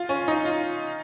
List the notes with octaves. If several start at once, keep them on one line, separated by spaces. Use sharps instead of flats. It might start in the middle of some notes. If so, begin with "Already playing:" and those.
Already playing: F4
C#4
D#4
F4